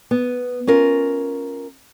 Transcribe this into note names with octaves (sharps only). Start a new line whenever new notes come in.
B3
C#4 F4 A#4